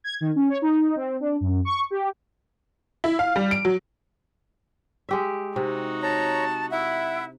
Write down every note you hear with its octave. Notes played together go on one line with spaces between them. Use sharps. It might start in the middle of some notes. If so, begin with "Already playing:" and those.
G#6
D#3
C#4
C#5
D#4
C4
D4
F#2
C#6
G4
E4
F5
G3
D7
F#3
G#3 G4 E5
C3 D#4 F#4
C#5 A5 A#5
E4 E5 F#5